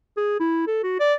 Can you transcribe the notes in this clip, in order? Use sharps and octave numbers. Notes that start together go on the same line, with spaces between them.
G#4
E4
A4
F#4
D5